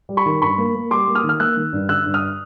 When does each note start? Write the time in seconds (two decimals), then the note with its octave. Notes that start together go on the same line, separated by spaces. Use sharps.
0.09 G3
0.17 B5 C#6
0.26 D#3
0.42 G2 B5 C#6
0.58 A#3
0.75 A#3
0.91 G3 C6 D6
1.08 A#3
1.15 D#6 F6
1.24 D#3
1.29 F6
1.40 A#3 E6 F#6
1.57 D#3
1.73 G2
1.89 D3 E6 F#6
2.06 G2
2.14 D#6 F6